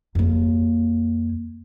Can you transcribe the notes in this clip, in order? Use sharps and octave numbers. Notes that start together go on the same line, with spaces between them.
F2 A#3